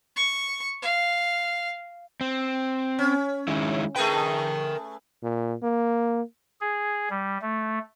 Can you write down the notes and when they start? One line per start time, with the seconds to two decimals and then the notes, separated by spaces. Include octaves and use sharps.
0.16 C#6
0.82 F5
2.21 C4
2.99 C#4
3.48 D#3 G#3 E4
3.96 A3 G#4 A#4 B4 G5
5.23 A#2
5.63 A#3
6.61 G#4
7.10 G3
7.42 A3